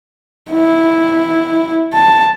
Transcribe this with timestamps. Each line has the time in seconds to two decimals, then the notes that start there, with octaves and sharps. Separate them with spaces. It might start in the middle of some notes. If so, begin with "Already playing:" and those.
0.52 E4
1.94 A5